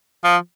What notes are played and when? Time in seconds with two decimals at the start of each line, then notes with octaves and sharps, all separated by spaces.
0.24 F3